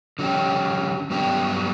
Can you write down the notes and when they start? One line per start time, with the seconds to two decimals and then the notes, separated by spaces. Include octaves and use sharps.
0.19 D3 F#3 C#4 G4
1.10 G2 F#3 B3 D4 G4